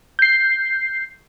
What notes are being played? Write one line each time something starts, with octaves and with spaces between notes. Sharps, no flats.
G6 C7